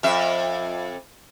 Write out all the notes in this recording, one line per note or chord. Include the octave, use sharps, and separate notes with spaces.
F2 E5